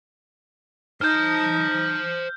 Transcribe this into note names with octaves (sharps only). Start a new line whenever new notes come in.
D#4 C5 A5 F6 G6